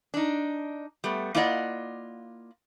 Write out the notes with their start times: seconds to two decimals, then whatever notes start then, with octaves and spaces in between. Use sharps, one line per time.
0.14 D4 D#4
1.04 G3 A3 B3
1.35 A#3 E4 F4 D5 D#5 F#5